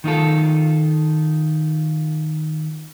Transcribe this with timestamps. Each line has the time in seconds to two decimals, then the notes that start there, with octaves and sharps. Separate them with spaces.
0.04 D#3 D#4 F4 A4